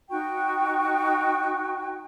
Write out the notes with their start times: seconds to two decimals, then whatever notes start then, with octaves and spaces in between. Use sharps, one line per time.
0.10 D#4 F#4 G5 C#6